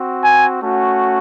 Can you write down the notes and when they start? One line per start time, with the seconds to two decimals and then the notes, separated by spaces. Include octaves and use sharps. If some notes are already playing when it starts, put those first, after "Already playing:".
Already playing: C4 F#4
0.20 G#5
0.62 A3 C#4 F#4